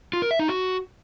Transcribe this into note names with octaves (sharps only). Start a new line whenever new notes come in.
F4
A#4
E5
D#4
F#4